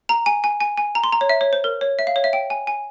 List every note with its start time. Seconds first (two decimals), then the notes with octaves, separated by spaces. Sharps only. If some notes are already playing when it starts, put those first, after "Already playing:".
0.09 A#5
0.26 G#5
0.44 G#5
0.61 G#5
0.78 G#5
0.95 A#5
1.04 C6
1.13 A#5
1.21 C#5
1.29 E5
1.41 C#5
1.53 C5
1.64 A#4
1.81 C#5
1.99 E5
2.07 F5
2.16 C#5
2.24 E5
2.33 G5
2.50 G#5
2.67 G#5